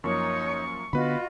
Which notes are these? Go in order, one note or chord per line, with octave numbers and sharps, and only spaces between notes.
F#2 F3 A#3 D#4 C#5 C#6
D3 B3 F4 F#4 B4 D#5 B5